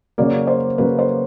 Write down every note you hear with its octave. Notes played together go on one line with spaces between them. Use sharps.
C#3 F#3 A#3 D5
C5
C#3 F#3 A#3 B4
C5